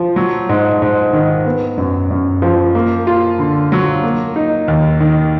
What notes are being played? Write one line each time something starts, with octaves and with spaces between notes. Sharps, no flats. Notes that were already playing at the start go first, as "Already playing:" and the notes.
Already playing: F3
F#3
G#2
G#2
D#3
B3
F#2
F#2
F3
A#3
F4
D3
F#3
A#3
D#4
D#2
D#3